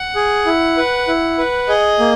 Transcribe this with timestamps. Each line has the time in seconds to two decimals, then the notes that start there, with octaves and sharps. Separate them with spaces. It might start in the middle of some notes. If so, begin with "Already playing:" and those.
Already playing: F#5
0.15 G#4
0.46 E4
0.77 B4
1.08 E4
1.38 B4
1.68 G#4 D#5
1.99 A#3